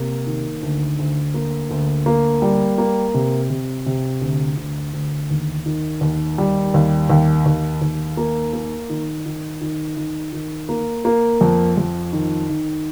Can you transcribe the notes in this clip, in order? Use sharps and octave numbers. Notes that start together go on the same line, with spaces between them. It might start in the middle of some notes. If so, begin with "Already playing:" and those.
Already playing: C3 A#3
D#3
D2
D2
A#3
D2
A#3
G3
A#3
C3
C3
C3
D2
D2
D2
D#2
D#3
D#2
G3
D#2
D#2
D#2
D#2
A#3
A#3
D#3
D#3
D#3
D#3
D#3
A#3
A#3
F2
F2
D#3
D#3